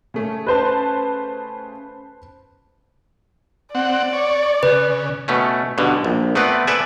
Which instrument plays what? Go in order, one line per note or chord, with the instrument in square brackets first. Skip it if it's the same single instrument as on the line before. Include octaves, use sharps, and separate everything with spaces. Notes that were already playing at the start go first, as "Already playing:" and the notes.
[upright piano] C#3 A3 C#4
[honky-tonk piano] B4 C5 A5
[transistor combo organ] C4 F#5 [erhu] D5
[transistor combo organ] C#5
[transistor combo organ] C#3 [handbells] B4
[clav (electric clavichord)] B2 A3 C#4
G2 B2 D3
A#1
A3 B3 C4 B4 D5
A4 B4 D5 E5 G#5